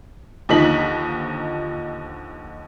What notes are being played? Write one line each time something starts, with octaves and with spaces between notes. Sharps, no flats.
D#2 D3 F3 D#4 B6 F#7